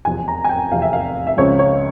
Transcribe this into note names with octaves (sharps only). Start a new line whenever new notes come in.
F1 E2 C3 F3 G#5
A#5
G#5
G5
F1 E2 C3 F3 F5
E5
F5
E5
C#2 C#3 F3 C4 C#5
C#5